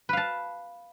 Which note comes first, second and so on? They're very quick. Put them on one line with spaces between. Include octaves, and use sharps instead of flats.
B4 F5 A5